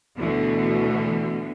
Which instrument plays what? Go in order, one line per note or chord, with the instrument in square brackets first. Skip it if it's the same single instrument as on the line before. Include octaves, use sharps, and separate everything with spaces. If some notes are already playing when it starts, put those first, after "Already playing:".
[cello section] D2 B2 D3 E3